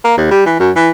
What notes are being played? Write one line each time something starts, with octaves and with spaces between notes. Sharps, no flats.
A#3
D#2
G3
E3
F#2
E3